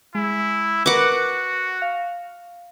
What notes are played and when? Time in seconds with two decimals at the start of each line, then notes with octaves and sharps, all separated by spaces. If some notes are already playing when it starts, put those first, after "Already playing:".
0.15 G#3 E4
0.86 F#4 A#4 B4 F#5 D6
1.82 F5